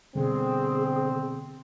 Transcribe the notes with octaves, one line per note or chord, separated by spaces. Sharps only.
B2 D3 G3 C4 G#4